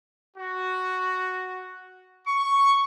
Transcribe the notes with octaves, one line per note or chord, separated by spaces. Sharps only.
F#4
C#6